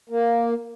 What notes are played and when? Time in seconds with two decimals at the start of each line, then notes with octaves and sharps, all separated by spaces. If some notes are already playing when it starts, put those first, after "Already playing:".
0.09 A#3